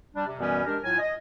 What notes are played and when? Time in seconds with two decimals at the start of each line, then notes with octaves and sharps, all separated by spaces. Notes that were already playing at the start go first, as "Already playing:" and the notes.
0.15 G3 D4
0.26 C3
0.39 F#2 B2 E3 G3 B3 C#4
0.65 G#3 D4 G4 A#4
0.83 A2 F#3 F4 G#5
0.99 D#5